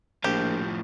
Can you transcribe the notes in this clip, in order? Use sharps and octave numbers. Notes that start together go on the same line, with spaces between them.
A#1 A2 F3 G4